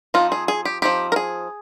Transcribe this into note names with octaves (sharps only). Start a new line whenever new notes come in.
F3 C4 D#4 F4
G#4
G#4
G4
F3 C4 D#4 G4
A#4
G#4